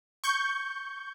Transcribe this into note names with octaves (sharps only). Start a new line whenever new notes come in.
C#6 G6